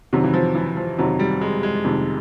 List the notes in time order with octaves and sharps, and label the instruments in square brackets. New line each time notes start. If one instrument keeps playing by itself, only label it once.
[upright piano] F2 C3 D#3 [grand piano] F#3
[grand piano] E3
F3
E3
F3
[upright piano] F2 C3 D#3 [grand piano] F#3
[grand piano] G3
G#3
G#3
[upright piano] F2 C3 D#3